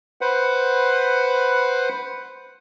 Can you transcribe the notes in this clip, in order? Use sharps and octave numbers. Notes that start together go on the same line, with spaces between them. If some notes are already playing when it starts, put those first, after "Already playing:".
B4 C5 F#5